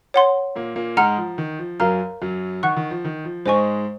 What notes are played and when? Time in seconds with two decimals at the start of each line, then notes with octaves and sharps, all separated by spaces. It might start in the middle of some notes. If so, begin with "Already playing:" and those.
0.14 C#5 F#5 C6
0.55 A#2 A#3
0.76 A#2 A#3
0.97 G#2 G#3 F#5 A#5 F6
1.17 F3
1.38 D#3
1.59 F3
1.80 F#2 F#3 A#4 F5 A#5 F6
2.21 F#2 F#3
2.63 D#3 F#5 C#6 F#6
2.77 D#3
2.91 F3
3.05 D#3
3.25 F3
3.45 G#2 G#3 C5 D#5 G#5 C#6